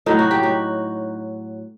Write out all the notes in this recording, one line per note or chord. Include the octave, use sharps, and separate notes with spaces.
A2 F#3 D#4
F#4
G4
F#4